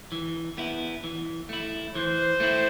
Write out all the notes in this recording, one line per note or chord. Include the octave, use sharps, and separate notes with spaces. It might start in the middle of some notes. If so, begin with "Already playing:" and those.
E3
B3 E4
E3
A3 E4
E3 C5
A3 E4